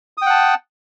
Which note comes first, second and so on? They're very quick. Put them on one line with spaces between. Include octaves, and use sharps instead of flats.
D#6 G5 F#5 A5